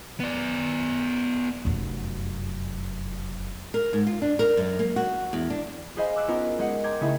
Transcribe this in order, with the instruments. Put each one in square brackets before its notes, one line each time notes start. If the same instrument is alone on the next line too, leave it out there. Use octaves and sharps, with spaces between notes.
[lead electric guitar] B3 D5
[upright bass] F1 F#2
[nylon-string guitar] A#4
G#2
F4
D4
A#4
F#2
A#3
F#4
E2
D4
[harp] G#4 B4 C5 D#5 F5 G#5
D6 E6 F#6 D7
B3 C#4 D#4 F4 A#4
G#3 C5 D#5 F#5
G5 A#5 C6 D6 G6 G#6
C#3 A3 C#4 D#4 E4 G#4